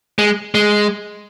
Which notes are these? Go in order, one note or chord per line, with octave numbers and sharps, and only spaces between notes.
G#3
G#3